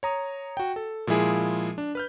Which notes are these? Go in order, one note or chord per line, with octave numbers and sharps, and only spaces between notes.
C#5 A#5 D#6
F#4 G5
A4
A#2 F3 G#3 E4 G#4
D4
B4 F6 G6